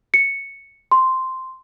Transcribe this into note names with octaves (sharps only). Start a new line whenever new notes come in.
C#7
C6